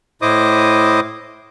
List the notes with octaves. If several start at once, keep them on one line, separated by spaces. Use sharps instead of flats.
A2 E4 C5 D#5 D6 D#6